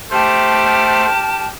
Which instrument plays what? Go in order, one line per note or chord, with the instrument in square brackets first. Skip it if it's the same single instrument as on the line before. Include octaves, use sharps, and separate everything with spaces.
[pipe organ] A3 C5 [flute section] G4 A5 F6